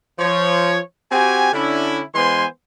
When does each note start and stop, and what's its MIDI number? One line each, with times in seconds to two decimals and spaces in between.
0.19 0.80 53
0.19 0.80 73
1.12 1.53 60
1.12 1.53 66
1.12 1.53 67
1.12 1.53 80
1.53 2.02 50
1.53 2.02 61
1.53 2.02 62
1.53 2.02 64
2.15 2.45 52
2.15 2.45 56
2.15 2.45 59
2.15 2.45 72
2.15 2.45 80
2.15 2.45 84